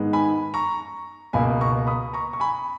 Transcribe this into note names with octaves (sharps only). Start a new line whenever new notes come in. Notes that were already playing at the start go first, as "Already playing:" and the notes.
Already playing: G#2 D#3 G#3 B3
G#5 B5
A#5 C#6
C#2 B2 A#3 G#5 B5
A#5 C#6
B5 D#6
A#5 C#6
C#6
G#5 B5